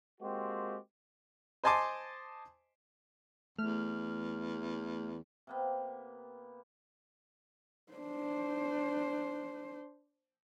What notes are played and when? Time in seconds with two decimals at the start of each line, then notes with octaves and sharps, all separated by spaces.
0.21 G#3 A#3 C4 F#4 G4
1.64 C5 D#5 G#5 A5 C6 D6
3.58 E2 A3 F6
5.47 C3 A#3 B3
7.93 D4 C5